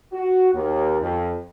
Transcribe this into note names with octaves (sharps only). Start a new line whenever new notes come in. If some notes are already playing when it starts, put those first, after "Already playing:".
F#4
D#2
F2